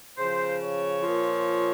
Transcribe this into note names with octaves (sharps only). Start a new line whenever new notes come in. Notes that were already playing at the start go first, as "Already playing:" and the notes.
C#3 F3 C5
C#5
A#2 F3